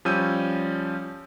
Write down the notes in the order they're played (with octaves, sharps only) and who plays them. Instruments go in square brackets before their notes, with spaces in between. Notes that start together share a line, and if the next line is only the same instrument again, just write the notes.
[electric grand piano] F3 G3 C#4 E6 G6 D#7